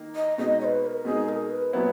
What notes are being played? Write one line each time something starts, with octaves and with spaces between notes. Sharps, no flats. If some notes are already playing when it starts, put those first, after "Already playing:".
Already playing: D#3 A#3 D#4
D#5
B2 G#3 D#4 D#5
C#5
B4
B4
A#4
B2 G#3 D#4 G#4
A#4
B4
A#2 F#3 B3 E4 C#5